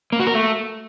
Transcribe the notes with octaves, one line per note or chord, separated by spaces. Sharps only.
A#3
F#4
A#4
A3